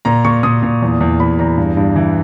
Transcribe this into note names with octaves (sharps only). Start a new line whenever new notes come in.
A#2 A#5
A#2 C#6
A#2 D#6
A#2
E2
E2
E2 B5
E2 A#5
G2
G2
E3